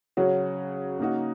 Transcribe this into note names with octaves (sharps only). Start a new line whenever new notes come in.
C#3 F#3 C#4 F#4
C#3 A#3 D#4 F#4